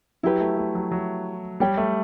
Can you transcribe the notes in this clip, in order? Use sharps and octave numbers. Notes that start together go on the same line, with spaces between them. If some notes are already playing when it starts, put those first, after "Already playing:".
F#3 E4 G4 B4
A3
A3
F#3
F#3
G3 G4 C#5 G5
A3